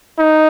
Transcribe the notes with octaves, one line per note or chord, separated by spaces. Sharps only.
D#4